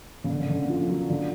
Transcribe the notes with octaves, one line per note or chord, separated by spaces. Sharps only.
C#3
D3
C#3
D3
F3
F3
F#3
D3